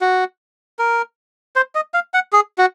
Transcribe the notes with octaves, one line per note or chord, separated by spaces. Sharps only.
F#4
A#4
C5
D#5
F5
F#5
G#4
F#4